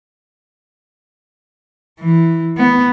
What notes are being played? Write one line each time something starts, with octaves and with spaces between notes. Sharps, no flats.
E3
B3